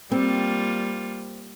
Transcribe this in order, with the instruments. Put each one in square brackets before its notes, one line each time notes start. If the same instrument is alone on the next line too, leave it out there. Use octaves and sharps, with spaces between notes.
[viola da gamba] G3 A#3 F4 [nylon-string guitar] C4